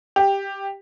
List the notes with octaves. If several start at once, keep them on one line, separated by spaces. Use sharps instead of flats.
G4